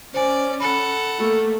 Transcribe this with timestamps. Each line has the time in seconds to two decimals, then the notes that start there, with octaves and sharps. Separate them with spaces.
0.14 C#4 C5 D5 G#5
0.60 A4 F#5 B5 F#6
1.20 A3 A#3